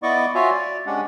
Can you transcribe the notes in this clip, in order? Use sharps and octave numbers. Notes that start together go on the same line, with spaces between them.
B3 E4 D5 D#5 C#6 D6
F4 F#4 C#5 E5 F5 G#5
D5
G#3 C#4 D4 G4 F#5